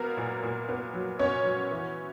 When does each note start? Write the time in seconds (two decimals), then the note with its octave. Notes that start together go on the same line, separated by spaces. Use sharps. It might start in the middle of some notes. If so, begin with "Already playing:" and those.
Already playing: F#3 A#3 B3 A#4
0.17 A#2
0.43 A#2
0.69 B3
0.94 F#3
1.19 B3 C#4 C#5
1.45 F#3
1.71 E3